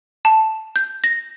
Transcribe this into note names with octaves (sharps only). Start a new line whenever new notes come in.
A5
G6
A#6